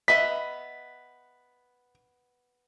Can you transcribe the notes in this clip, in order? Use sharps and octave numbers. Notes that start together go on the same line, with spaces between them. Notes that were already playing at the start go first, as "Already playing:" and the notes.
B3 D#5 E5 B6